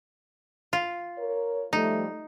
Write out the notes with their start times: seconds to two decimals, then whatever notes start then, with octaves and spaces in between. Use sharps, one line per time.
0.73 F4
1.18 A#4 C#5
1.73 F3 G3 A3 D#4